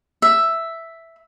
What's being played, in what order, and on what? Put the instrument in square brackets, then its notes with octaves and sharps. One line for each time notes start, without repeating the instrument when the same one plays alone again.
[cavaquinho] E5